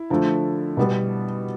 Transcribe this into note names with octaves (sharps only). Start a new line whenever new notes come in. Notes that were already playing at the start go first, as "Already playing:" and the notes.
Already playing: E4
D3 F3 A3
B2 G3 B3